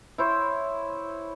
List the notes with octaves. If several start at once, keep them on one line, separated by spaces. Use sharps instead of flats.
E4 C5 C#5